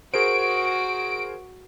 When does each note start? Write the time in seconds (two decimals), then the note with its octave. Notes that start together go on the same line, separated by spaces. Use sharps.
0.14 F#4 G#4 A#4 C5 D7